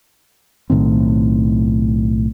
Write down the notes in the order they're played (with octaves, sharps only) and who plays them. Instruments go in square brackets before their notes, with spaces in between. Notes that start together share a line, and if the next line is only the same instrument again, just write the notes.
[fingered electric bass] B1 A2 D#3 C4